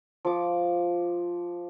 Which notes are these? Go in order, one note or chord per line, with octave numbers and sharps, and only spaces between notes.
F3 D6